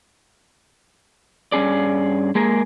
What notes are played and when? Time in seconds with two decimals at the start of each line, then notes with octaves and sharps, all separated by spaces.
1.52 G2 C#4 G#4 D5
2.35 G#3 A#3 G#4 A#4